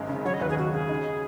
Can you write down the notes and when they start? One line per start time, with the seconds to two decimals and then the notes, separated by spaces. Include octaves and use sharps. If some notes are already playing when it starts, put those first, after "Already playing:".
Already playing: G#1 F#2 G#3
0.09 C#3
0.25 F#3 C#5
0.34 D#5
0.41 D#2 B4
0.49 G#4
0.57 C#3 F#4
0.73 C#3 G#4
0.89 D#4